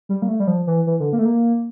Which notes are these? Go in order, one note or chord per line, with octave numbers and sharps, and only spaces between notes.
G3
A#3
A3
G3
F3
E3
E3
D3
A#3
A3
A#3